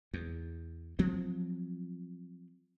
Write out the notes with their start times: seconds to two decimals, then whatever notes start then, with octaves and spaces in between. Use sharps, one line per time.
0.14 E2
0.99 F3 F#3 C4